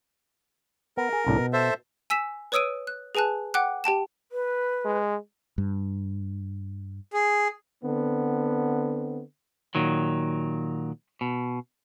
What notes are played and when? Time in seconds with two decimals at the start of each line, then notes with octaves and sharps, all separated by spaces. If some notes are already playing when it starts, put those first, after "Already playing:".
0.97 B3 A#4
1.13 G#4
1.27 C2 A2 D4
1.38 B2
1.53 A4 C5 E5
2.10 G#5 E6 B6 E7
2.52 B4 C#5 D#6 E6 D7 D#7
2.87 F#6
3.15 G#4 B4 G#5 A5 F#6
3.54 F#5 G5 D6 F#6
3.84 G4 G5 A5 E7
4.32 B4
4.85 G#3
5.58 G2
7.13 G#4
7.84 D3 B3 C4
9.75 A#2 D#3 F#3
11.21 B2